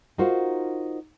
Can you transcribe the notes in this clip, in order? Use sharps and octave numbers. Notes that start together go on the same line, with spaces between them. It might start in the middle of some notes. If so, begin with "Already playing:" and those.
D#4 F4 F#4 A#4 C5